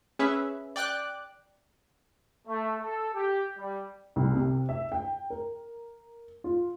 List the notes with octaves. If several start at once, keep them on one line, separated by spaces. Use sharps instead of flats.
C#4 G#4 B4 E5
D5 G5 D6 F#6
A3
A4
G4
G3
C2
C3
E5
G5
A#4
F4